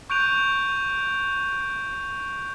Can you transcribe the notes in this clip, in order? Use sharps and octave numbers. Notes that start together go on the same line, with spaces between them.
C#6 F#6 G6 D7 D#7 F7